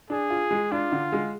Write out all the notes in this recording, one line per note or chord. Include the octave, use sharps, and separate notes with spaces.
D4 G#4
F4
G#3
D4 F4
D3
G#3